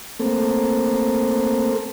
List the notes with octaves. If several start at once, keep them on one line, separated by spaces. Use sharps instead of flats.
A3 A#3 C4